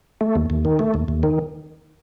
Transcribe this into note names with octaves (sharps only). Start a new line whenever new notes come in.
A3
D#2
D#2
D#3
A3
D#2
D#2
D#3